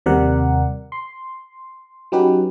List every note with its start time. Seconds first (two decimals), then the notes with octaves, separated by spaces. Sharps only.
0.06 D#2 C3 G3 A#4 D5 F#5
0.92 C6
2.12 F#3 C#4 D#4 G4 B4